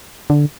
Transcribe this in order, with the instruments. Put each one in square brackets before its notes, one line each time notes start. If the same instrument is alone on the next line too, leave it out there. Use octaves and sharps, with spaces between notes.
[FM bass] D3